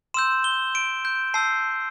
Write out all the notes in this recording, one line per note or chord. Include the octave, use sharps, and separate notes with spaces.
C6 E6 G6 E7
G7
D7
G6
A5 E6 G6 C7